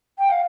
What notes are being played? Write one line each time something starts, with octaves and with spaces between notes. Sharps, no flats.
G5
F5